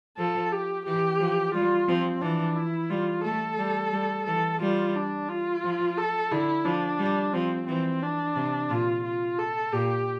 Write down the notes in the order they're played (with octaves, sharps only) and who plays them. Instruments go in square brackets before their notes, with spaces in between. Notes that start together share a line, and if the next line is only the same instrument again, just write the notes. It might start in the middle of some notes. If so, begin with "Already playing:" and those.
[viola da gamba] F3 [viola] A4
[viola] G4
[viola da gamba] E3 [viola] G4
[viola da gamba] F3
[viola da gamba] G3 [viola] F4
[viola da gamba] F3 [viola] C4
[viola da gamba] E3 [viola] D4
[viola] E4
[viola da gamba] G3 [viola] F4
[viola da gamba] A3 [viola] A4
[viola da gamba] G3
G3
[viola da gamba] E3 [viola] A4
[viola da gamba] G3 [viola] F4
[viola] D4
F4
[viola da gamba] F3
[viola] A4
[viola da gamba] D3 [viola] E4
[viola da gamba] F3 [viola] D4
[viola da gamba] G3
[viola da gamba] F3 [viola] C4
[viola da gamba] E3 [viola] C4
[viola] D4
[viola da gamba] C3
[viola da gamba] A#2 [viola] F4
[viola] F4
A4
[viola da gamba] A#2 [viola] G4